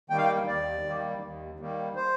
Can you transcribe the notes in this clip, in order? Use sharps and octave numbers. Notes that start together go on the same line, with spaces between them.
D#3 G3 A#3 G5
F5
G5
D#2 D5
D#3 G3 A#3
D#2
D#3 G3 A#3
C5